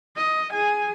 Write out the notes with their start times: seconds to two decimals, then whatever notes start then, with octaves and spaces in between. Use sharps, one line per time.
0.16 D#5
0.52 G#4 G#5